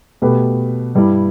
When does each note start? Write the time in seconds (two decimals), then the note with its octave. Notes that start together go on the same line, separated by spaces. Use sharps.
0.22 B2 A3 G4 B4
0.95 G2 G3 E4